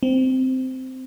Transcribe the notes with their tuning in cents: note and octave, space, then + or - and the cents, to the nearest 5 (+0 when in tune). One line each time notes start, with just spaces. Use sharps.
C4 -10